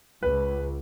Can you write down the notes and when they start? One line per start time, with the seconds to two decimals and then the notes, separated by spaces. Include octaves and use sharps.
0.23 C#2 B4